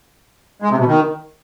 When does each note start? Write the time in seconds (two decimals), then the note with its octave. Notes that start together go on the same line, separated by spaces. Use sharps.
0.62 G#3
0.70 C3
0.79 B2
0.87 D#3